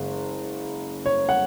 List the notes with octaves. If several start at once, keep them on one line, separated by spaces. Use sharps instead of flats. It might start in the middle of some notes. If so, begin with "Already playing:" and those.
Already playing: F#1 C#3 G#3
C#5
F#5